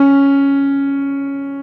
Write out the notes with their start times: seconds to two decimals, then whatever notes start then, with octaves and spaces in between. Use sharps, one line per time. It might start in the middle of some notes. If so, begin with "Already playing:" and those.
Already playing: C#4